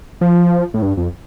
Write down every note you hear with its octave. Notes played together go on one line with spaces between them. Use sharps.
F3
A2
G2
F2